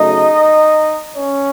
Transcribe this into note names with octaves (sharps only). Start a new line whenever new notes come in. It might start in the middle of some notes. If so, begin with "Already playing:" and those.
Already playing: C#3 F#3 A3 D#4 D#5
C#4 C#5